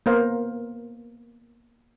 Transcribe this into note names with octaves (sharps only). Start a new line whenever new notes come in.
A#3 B3 A#4 C5 F5